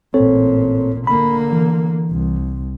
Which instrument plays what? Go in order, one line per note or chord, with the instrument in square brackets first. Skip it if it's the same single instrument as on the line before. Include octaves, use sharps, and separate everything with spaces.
[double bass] A1 A#2 [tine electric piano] C4 A4 C#5
[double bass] D3 A#3 [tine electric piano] B5
[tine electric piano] E3
[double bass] C2